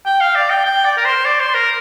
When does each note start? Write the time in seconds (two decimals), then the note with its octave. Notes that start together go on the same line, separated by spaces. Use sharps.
0.06 G5
0.21 F5
0.35 D5
0.50 G5
0.65 G5
0.85 D5
0.97 A#4
1.05 C5
1.25 D5
1.40 C5
1.55 A#4